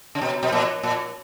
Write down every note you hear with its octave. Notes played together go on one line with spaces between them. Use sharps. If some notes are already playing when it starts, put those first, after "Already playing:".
C#3
B2
B2
A#2
A#2